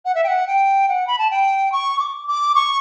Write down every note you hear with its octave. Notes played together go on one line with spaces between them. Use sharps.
F#5
E5
G5
F#5
G5
F#5
B5
A5
G5
C#6
D6
D6
C#6